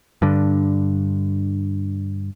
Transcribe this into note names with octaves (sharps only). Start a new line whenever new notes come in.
G2 D3